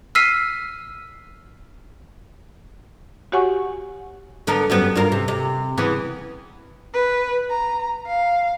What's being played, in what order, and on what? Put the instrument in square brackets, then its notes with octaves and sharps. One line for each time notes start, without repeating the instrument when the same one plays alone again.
[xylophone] E6 F6 B6 C7 D#7
[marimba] F#4 G4 C#5 F#5 G#5 C#6
[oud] D3 B3 A#4
F#2 G3 B3
G2 F4 A#4
C3
C3
C#3 E3 B3
[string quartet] B4
A#5
F5